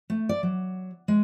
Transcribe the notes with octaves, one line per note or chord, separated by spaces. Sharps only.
A3
D5
F#3
G#3